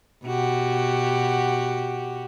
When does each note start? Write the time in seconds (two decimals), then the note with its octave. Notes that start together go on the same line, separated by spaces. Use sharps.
0.24 B2 F#4 G4